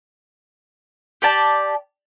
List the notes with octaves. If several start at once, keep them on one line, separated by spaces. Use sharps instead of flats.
G4 D5 A5